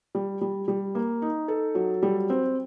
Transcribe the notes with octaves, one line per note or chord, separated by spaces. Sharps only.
G3
G3
G3
A#3
D#4
A4
F#3
G3
C4